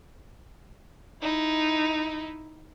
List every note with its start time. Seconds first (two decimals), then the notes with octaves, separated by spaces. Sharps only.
1.22 D#4 E4